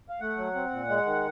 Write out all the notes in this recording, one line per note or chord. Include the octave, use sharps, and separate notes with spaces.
F5
A3 F#5
F#3
C4
A#2
G#3
D#3